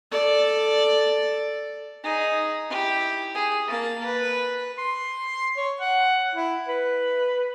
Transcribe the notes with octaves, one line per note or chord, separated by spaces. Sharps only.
A4 D5
D#4 G#4
E4 G4
G#4
A#3 A5
B4
C6
C#5
F#5
E4
B4